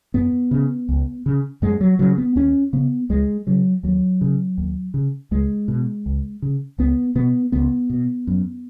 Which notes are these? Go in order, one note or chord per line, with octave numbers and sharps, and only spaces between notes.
F#2 B3
C#3
C#2
C#3
F#2 G#3
F#3
C#3 F#3
B3
D#2 C#4
C#3 B3
C#2 G#3
C#3 F#3
D#2 F#3
C#3
D#2
C#3
C#2 G#3
B2
C#2
C#3
C#2 B3
B2 B3
C#2 B3
B2
F#2